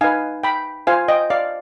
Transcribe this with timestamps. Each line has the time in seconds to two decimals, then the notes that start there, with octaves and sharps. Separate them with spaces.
0.01 D#4 B4 F5 G#5
0.44 G5 B5
0.87 F4 C5 F5 G#5
1.08 D#5 G5
1.30 D5 F5